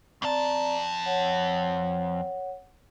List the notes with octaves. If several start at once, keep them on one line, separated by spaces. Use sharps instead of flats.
F2 C4 D5 A5 A#5
C#5 F#5